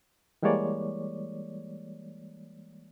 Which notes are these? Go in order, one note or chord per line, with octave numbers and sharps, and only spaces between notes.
E3 G3 G#3 A#3 C#5 D5